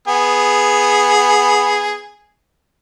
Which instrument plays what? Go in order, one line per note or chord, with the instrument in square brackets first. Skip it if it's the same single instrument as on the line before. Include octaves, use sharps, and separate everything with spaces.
[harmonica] B3 G#4